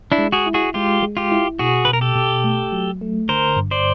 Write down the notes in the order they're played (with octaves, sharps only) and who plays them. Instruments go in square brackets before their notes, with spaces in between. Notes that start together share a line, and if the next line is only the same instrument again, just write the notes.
[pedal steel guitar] D4 E4
[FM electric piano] G#3
[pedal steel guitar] F#4 G#4
[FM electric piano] E4
[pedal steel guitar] F#4 G#4
[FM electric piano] G#3 [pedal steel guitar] F4 G4
[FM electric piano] G#3
[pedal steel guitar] F4 G4
[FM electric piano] E4
[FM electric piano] B2 [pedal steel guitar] F#4 G#4
[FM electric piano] B2 [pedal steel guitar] B4
[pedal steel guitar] A#4
G4 A4
[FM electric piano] B2
A3
F#3
A3
[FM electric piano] D3 [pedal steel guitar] A#4 C5
[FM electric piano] G2
[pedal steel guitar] C5 D5